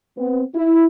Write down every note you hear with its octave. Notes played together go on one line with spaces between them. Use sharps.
B3 C4
E4